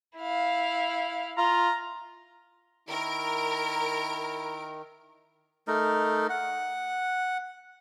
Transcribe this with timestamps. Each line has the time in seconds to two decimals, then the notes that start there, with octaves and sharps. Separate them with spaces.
0.18 E4 F5
1.38 F4 A#5
2.89 D#3 E4 A#4 D7
5.68 A3 D#4 A#4
6.30 F#5